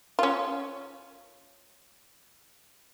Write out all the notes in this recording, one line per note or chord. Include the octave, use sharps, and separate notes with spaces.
C#4 F4